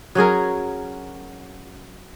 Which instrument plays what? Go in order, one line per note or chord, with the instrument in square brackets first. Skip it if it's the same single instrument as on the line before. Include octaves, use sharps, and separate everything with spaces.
[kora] F#3 C#4 G#4 A#4